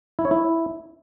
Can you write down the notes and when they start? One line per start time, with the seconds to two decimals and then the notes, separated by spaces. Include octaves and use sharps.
0.19 E4
0.25 C#5
0.31 E4